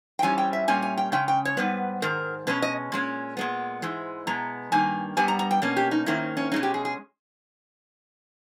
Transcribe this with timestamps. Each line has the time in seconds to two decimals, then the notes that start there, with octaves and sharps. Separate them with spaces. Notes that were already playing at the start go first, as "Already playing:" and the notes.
0.19 G5
0.22 G#2 E3 G3 C#4 G#5
0.38 G5
0.53 E5
0.68 A#2 G3 A#3 C#4 G#5
0.82 G#5
0.98 G5
1.12 C#3 G#3 C#4 G5
1.28 G5
1.45 C#5
1.57 G#2 G3 B3 B4
2.02 G#2 D#3 A#4
2.47 B2 G#3 C#4 B4
2.62 D#5
2.92 A#2 G#3 C#4
3.37 A#2 G#3 B3
3.82 G#2 E3 G#3
4.27 B2 G#3 B3 A#5
4.72 G2 D#3 A#3 G#5
5.17 G2 G3 B3 G#5
5.28 A#5
5.39 A#5
5.51 G5
5.62 B2 A#3 C#4
5.77 G4
5.91 D#4
6.06 G#2 D#3 A#3 C#4 E4
6.37 C#4
6.52 B2 G#3 C#4 D#4
6.63 G4
6.74 G#4
6.85 G#4